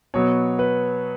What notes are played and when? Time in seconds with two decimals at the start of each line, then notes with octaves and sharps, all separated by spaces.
0.14 B2 F#3 B3 C#5
0.59 B4